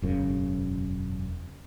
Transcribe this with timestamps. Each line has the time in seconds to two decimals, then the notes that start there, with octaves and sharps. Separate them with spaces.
0.02 E1 F#2 C#3